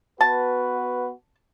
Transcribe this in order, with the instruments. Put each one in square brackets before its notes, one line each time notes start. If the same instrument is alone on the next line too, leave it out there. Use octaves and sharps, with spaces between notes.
[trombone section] B3 F#4 B4 [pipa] A5